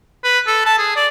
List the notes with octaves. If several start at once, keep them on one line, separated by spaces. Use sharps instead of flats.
B4
A4
A5
G#4
D5